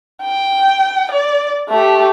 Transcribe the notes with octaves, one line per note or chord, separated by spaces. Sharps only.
G5
D5
A3 G4